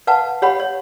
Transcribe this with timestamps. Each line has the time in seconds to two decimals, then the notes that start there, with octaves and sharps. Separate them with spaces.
0.07 B4 F5 F#5 A5
0.42 G4 C#5 F5 F#5 B5
0.60 C#5